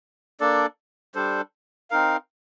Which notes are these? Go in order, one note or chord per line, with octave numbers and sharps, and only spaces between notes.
A#3 D4 A4 D5
G3 D4 A4 C5
C4 D#4 A#4 F5